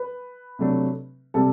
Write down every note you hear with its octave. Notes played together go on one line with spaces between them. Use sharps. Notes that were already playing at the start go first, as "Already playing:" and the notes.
Already playing: B4
C3 F#3 A3 D4
C3 G3 A4